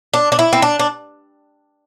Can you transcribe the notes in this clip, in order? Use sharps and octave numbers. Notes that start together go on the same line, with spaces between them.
D4
D4
E4
C4
D4
D4